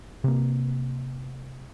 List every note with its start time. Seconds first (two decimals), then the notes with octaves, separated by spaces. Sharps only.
0.24 C3 A#3